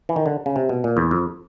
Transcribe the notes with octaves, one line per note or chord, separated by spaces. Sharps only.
E3
D#3
D3
C#3
C3
B2
A#2
E2
F2